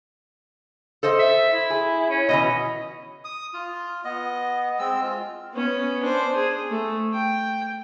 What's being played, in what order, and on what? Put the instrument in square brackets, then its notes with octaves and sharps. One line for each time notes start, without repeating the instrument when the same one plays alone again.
[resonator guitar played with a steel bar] A4 C5 D#5
[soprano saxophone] E5
E4
[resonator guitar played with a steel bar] G#4
[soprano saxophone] C#4
[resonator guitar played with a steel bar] B2 D#3 E3 [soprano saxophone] D#5
[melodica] D#6
F4
B3 D#5
G#3 C4 E6
F4
[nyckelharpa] B3 C#4
D4 C5
G#4
A3
G5